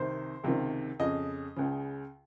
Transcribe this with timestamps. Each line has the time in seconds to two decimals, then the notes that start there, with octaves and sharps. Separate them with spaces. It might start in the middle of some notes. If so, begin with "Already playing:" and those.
Already playing: C2 C3 D#3 C5
0.44 C#2 C3 D#3
0.99 F2 C#3 D#5
1.56 C#2 C#3